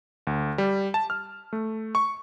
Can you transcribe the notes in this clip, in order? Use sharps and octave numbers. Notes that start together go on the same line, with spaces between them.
D2
G3
A5
F6
A3
C#6